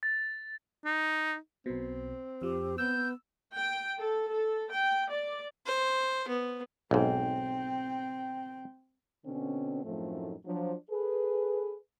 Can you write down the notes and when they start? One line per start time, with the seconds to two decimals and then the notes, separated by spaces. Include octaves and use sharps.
0.03 A6
0.85 D#4
1.66 B1 B2 C4
2.42 F2 F3 G4
2.78 B3 E6 G6
3.53 G5
3.98 A4
4.30 A4
4.73 G5
5.11 D5
5.66 C5
6.28 B3
6.91 B1 G#2 C4 G5
9.26 B2 D3 C4 C#4
9.84 F#2 A2 F3 A3 C4 D#4
10.46 F3 F#3 D4
10.91 G#4 A4 B4